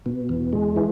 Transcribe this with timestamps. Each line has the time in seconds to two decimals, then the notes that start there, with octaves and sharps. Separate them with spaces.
0.06 B2
0.29 E2
0.53 G#3
0.76 E3